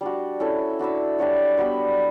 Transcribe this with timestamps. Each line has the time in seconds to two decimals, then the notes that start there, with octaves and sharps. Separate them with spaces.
0.01 G3 D4 F#4
0.40 C#4 E4 A4 C#5
0.79 D4 F#4 B4 E5
1.19 G3 D4 F#4 C#5
1.57 G3 B3 F#4 B4